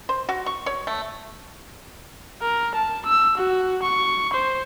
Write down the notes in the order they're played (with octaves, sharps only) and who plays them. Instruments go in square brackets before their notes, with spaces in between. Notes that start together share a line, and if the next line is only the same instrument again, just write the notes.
[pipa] C5
F#4
C#6
C#5
A3
[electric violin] A#4
A5
E6
F#4
C#6
C5